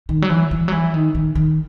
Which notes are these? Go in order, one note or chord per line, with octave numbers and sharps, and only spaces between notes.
D#3
F#3
E3
E3
F#3
E3
D#3
D#3
D#3